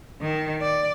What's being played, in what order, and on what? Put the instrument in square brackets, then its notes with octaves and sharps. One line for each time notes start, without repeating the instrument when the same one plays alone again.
[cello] D#3
D5